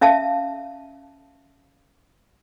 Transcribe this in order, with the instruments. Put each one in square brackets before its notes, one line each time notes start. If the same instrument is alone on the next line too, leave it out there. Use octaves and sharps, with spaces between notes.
[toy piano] C#4 E5 F5 A5